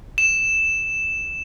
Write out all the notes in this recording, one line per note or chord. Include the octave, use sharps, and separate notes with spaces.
E7